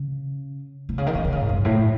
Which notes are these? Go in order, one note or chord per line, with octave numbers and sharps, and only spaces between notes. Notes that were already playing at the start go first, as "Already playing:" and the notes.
Already playing: C#3
C3
C#3
D#3
E3
C3
C#3
G#2
F#2
A2